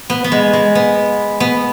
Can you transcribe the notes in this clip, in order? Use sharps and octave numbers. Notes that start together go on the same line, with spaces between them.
B3
B3
G#3
G#3
B3
B3